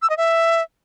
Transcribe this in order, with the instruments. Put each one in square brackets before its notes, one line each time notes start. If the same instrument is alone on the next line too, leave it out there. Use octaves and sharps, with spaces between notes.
[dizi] E6
D#5
E5